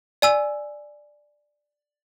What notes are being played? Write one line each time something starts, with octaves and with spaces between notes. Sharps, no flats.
D5 G#5 E6